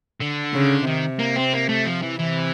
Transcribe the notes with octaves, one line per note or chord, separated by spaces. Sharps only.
D3
C#3
C3 D#3
A#3
C4
A#3
A3
F3
E3
C3 E3